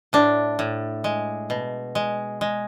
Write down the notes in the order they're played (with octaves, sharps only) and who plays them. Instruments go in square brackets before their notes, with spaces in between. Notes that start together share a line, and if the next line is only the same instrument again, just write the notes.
[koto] A2 D4
A2
G#3
B2
G#3
G#3